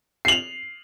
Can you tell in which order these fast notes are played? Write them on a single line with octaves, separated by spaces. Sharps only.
C7 F#7 F7